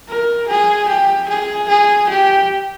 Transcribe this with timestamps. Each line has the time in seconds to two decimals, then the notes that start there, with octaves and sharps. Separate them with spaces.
0.09 A#4
0.48 G#4
0.88 G4
1.29 G#4
1.69 G#4
2.09 G4